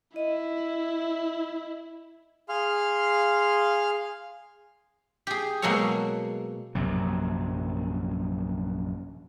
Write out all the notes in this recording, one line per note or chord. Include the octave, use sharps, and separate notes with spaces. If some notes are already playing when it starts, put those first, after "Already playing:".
E4 D#5
G#4 F5 C6 F6
G4 G#4
B2 F#3 G#3 A#3 A4 C#5
A#1 F#2 C3 F#3